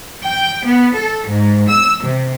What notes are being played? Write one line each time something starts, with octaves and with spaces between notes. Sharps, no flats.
G5
B3
A4
G#2
E6
C3